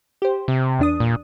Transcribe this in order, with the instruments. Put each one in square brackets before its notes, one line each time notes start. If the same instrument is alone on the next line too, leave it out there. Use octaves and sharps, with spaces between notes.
[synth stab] G4 C5
[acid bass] C3
[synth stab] E2 D4 D#6
[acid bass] A#2